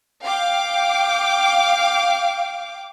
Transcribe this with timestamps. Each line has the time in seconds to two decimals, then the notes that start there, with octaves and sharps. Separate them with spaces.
0.22 F5 G5 D6